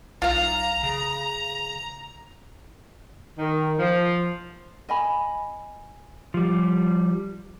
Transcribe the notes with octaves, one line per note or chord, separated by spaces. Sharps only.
B1 F4 F5 A#5
C#3 A#5
D#3
F3
D#5 G#5 B5
F3 G3